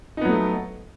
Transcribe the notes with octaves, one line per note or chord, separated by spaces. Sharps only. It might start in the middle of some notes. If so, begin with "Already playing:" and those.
F#3 A3 B3 D#4